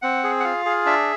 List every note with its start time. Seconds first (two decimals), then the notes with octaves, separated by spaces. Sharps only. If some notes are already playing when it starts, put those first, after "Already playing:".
0.02 C4 F#5
0.24 G#4
0.40 F#5
0.44 F4 F5
0.65 G#4
0.86 D4 E5